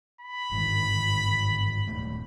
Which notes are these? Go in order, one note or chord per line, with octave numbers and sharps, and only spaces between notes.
B5
G1 G#2 D#3
D#1 A3